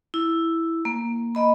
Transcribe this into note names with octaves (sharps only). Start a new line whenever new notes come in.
E4
A#3
A#3 D#5 B5